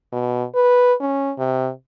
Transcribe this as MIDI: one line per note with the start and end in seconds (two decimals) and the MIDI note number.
0.12 0.44 47
0.55 0.94 71
1.01 1.32 61
1.38 1.70 48